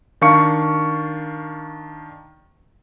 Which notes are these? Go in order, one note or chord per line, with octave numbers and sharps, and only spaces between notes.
D#3 D4 F5 C#6 C#7